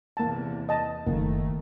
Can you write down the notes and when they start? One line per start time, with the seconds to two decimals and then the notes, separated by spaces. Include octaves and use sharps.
0.17 E2 C3 A#3 A5
0.69 D#5 A5
1.07 F#1 D#3 A3 A#3